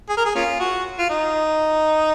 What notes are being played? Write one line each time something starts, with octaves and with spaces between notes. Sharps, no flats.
G#4
A#4
G#4
A#3 C#4 F4
F#4
F4
D#4